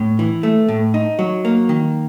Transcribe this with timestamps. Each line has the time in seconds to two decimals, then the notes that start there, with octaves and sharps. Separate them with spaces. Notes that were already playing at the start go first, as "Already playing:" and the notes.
Already playing: A2
0.19 E3
0.43 A3
0.68 A2
0.94 D#4
1.19 F#3
1.45 A#3
1.69 D#3